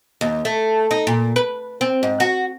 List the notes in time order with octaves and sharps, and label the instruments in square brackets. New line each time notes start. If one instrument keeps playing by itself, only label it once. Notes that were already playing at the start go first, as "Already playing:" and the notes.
[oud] D#2
A3
D#4
A#2
B4
C4
G#2
F#4